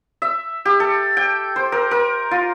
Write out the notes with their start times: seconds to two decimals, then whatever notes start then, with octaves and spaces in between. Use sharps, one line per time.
0.22 E5
0.65 G4
0.80 A4
1.17 G5
1.56 C5
1.72 A#4
1.91 A#4
2.31 F4